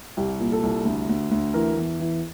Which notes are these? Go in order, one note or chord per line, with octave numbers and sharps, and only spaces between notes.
C2 G4
A#2
A4
C2
D2
D2
D2
E3 A#4
E2
E3